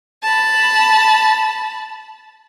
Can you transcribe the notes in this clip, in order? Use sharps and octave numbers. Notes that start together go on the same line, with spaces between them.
A5 B5